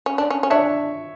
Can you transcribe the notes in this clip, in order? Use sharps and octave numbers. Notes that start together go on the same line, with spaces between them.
C#4
D4
C#4
C#4
D4 C#5 E5